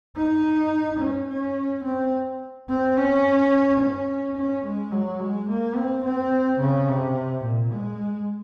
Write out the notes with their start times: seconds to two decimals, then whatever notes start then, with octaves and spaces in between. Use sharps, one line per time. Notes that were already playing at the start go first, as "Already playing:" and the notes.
0.17 D#4
1.00 C#4
1.28 C#4
1.84 C4
2.69 C4
2.97 C#4
3.80 C#4
4.37 C#4
4.64 G#3
4.92 F#3
5.20 G#3
5.49 A#3
5.76 C4
6.04 C4
6.60 C#3
6.89 C3
7.44 A#2
7.72 G#3